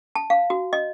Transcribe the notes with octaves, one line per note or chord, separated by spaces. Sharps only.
A5
F5
F#4
D#5